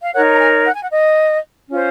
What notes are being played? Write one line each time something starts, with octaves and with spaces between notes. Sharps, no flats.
F5
D#4 A#4 C#5 F#5
A#5
G#5
F#5
G#5
F#5
D#5
C#4 F4 C5